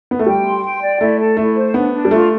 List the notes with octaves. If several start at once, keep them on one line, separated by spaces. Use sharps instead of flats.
B3
A3
G3 G5
C6
G5
D5
A3 E4
A4
A3 E4
C5
B3 D4
D4
G3
A3 F4